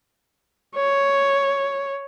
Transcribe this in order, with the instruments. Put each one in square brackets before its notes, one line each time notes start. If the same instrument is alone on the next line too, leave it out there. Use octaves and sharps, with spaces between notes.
[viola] C#5